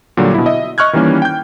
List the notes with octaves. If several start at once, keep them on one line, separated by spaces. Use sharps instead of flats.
A#2 D3 F#3 G3
B2 E4
D#5 E5
D#5 C#6 F6 F#6 G#6
D#3 E3 G3 A#3 C#4
G5 G6